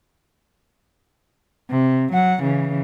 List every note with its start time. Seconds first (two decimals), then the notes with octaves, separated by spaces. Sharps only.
1.71 C3
2.12 F#3 F#5
2.42 C#3 E3